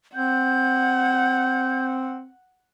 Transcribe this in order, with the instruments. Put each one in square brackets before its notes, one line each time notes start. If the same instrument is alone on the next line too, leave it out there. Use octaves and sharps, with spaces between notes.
[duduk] C4 [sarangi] F#5 [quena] G6